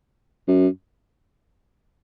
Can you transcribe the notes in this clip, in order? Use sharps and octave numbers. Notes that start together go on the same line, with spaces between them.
F#2